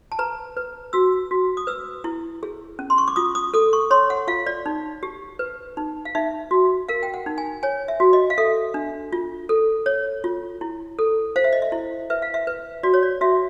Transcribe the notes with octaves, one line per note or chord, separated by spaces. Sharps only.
A5
B4 A#5
B4
F#4 E6
F#4
D#6
B4 E6
E4
G#4
C#4
C6
C#6
D6
F4 D#6
D#6
A4 D#6
C#6
C#5 C6
F#5
F4 F5
D5
D#4
G4
B4
D#4
F5
D#4 E5
F#4
A#4 F5
G5
F#5
D#4
G#5
C#5 G#5
E5
F#4
D#5
F5
A4 E5
D4
F4
A4
C#5
F4
E4
A4
C5 F5
E5
D#5
E5
E4
B4 E5
F5
E5
B4
F#4 D5
C#5
D5
F#4 E5